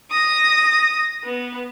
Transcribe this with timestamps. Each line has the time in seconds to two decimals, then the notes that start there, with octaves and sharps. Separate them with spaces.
0.11 D#6 A#6
1.24 B3